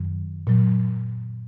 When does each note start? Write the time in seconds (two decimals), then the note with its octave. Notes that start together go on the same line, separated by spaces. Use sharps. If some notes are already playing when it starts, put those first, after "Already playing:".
Already playing: F#2 D#3 F#3
0.47 A#2 F#3